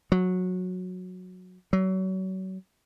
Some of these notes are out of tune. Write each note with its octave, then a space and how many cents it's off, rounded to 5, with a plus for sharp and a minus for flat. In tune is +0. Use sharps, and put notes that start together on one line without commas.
F#3 -15
F#3 +30